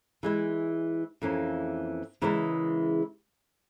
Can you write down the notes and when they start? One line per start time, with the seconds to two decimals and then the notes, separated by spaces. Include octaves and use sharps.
0.23 E3 G#3 E4
1.22 F2 E3 A#3 C#4
2.22 C#3 E3 G#3 E4 A#4